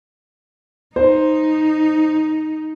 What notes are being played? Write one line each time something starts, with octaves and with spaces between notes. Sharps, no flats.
D#4 C5